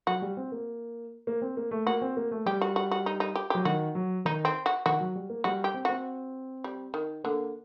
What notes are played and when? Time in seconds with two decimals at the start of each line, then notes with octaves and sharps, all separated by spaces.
0.07 F#3 F#4
0.22 G3
0.37 C4
0.52 A#3
1.27 A#3
1.42 C4
1.57 A#3
1.71 A3
1.86 A#3 F#4
2.02 C4
2.17 A#3
2.31 A3
2.46 G3 G4
2.61 F#4
2.76 F#4
2.91 F#4
3.06 D#4
3.20 D#4
3.35 G4
3.50 F#3 G4
3.65 D#3 F#4
3.95 F#3
4.25 D#3 D#4
4.45 C4
4.66 F#4
4.86 D#3 F#4
5.00 F#3
5.15 G3
5.30 A#3
5.44 G3 F#4
5.64 G4
5.74 C4
5.85 C4 F#4
6.64 G3
6.94 D#3
7.24 D3 A#3